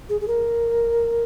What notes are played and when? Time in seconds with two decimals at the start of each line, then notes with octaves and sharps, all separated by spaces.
0.09 G#4
0.21 G#4
0.28 A#4